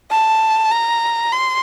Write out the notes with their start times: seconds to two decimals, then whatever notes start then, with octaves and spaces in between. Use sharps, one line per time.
0.11 A5
0.71 A#5
1.32 C6